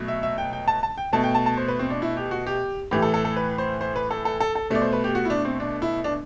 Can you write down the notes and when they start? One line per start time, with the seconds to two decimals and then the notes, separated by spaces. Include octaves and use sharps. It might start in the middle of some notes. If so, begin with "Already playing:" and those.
Already playing: B2 F#3 A3
0.08 E5
0.23 E5
0.38 G5
0.53 G5
0.68 A5
0.83 A5
0.98 G5
1.13 B2 A3 A5
1.24 G5
1.35 A5
1.46 A5
1.57 C5
1.68 B4
1.79 C4
1.90 D4
2.02 E4
2.17 G4
2.31 F#4
2.47 G4
2.91 A2 E3 A3 G4
3.02 A4
3.14 A4
3.25 A4
3.36 B4
3.58 C5
3.81 C5
3.96 B4
4.11 A4
4.25 A4
4.40 A4
4.55 A4
4.70 B2 A3 D5
4.82 C5
4.93 B4
5.04 G4
5.15 F#4
5.25 E4
5.30 D4
5.45 C4
5.60 D4
5.82 E4
6.04 D4